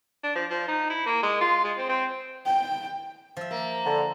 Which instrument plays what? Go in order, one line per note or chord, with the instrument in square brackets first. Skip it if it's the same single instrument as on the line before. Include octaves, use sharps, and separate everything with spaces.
[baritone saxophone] D4
F3
F3
D#4
E4
A#3
G#3
F4
G#3
C4
C4
[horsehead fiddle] G5
[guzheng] F3 E5
[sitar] A#3
[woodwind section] D3